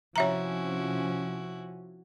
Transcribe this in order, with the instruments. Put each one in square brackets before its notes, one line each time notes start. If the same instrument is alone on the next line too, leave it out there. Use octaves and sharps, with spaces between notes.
[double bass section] C3 F3 C#4 [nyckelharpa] E4 F#4 [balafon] C#5 E5 A#5